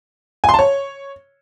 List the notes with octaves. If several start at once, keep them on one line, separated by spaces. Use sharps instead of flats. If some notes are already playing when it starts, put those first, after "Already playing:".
G#5
C6
A5
C#5